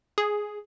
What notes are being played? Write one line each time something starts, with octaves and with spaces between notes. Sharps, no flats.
G#4